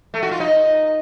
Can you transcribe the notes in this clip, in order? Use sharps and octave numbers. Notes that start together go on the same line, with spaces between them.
A3
F#4
F4
D#4